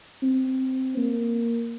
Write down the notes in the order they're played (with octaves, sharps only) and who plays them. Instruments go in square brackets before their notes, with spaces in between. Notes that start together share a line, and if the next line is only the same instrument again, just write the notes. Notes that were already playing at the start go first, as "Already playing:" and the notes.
[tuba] C4
A#3